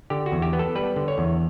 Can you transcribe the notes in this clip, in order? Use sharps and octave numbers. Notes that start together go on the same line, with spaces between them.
D3 G4
F#4
E2
G4
B3
A4
G3 B4
D3
C#5
E2